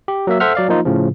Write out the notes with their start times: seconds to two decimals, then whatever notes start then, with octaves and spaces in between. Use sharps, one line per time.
0.08 G4
0.27 F#3 A#3 E5
0.40 A4 C5 E5 F#5 F6
0.55 F#3 D5 F5
0.69 F3 A#3 D#4 F4
0.85 A2 C#3 F3